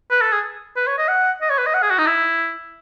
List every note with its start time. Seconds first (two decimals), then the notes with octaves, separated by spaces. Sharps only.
0.11 B4
0.21 A4
0.32 G#4
0.76 B4
0.87 C#5
0.98 D#5
1.08 F#5
1.41 D#5
1.50 C#5
1.58 B4
1.66 D#5
1.74 F#5
1.82 G#4
1.90 F#4
1.98 D#4
2.07 E4